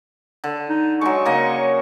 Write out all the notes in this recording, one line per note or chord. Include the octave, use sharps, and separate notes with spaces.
D3
D#4
F#3 G#3 C#6
C#3 A#3 D#5